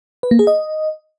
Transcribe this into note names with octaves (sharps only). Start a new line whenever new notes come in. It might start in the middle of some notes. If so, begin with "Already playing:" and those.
B4
A#3
G#4
D#5